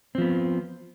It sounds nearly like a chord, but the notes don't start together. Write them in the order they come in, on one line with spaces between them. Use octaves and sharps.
C4 F3 B3